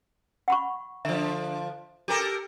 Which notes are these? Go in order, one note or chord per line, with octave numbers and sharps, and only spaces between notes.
F#5 B5 C#6
D3 F3 E5
G4 A4 A#4